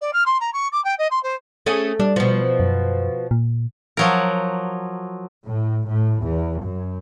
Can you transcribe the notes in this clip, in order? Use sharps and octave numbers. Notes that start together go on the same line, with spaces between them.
D5
F6
C6
A#5
C#6
D6
G5
D#5
C6
C5
A3 C#4 G#4
G3 D4
B2 F3
F#2
A#2
F3 F#3 A#4
A2
A2
E2
F#2